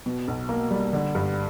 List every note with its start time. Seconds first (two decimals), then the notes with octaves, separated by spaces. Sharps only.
0.06 B2
0.28 B1
0.49 A#3
0.71 G3
0.93 D3
1.15 G2